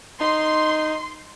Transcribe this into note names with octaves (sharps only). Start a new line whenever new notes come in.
D#4 C6